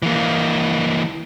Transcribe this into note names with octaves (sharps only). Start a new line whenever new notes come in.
E3 A#3